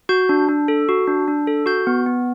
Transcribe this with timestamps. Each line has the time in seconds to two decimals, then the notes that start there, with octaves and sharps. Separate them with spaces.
0.09 F#4 G6
0.29 D4
0.49 D4
0.68 A4
0.89 F#4
1.08 D4
1.28 D4
1.47 A4
1.66 F#4 G6
1.87 B3
2.06 B3